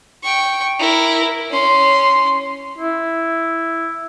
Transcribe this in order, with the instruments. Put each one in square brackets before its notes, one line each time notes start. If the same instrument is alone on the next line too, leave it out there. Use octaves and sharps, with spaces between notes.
[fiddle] G5 C#6
E4 A#4
C#4 C6
[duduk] E4